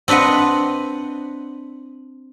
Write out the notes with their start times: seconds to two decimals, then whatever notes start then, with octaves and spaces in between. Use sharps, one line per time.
0.08 C4 D4 B4 D#5 F#5